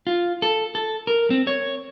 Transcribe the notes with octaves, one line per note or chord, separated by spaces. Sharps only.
F4
A4
A4
A#4
C4
C#5